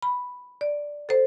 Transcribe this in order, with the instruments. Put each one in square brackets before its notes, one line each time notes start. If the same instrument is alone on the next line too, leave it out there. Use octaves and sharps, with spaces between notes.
[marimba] B5
D5
A4 C5